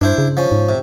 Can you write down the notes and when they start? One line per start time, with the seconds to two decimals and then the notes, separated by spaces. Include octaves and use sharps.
0.01 G2 D4 E4 C5
0.18 C#3
0.37 F3 C#4
0.52 G#2
0.69 C3